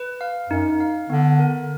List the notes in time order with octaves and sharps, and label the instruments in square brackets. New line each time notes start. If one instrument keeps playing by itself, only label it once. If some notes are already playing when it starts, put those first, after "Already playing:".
Already playing: [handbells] B4
F5
[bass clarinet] F#2 [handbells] D#4
[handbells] F5
[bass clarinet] D3 [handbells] B3
[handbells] A#4